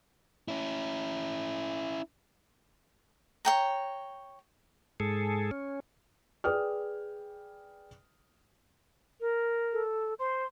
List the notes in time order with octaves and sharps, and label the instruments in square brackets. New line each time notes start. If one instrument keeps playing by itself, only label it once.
[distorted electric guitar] C#4 E4
[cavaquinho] C#5 G5 A#5
[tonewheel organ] G#2 G#4 A4
C#4
[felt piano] G#4 B4 D5 G5 D#6 F6
[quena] A#4
[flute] A4
[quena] C5 [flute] C6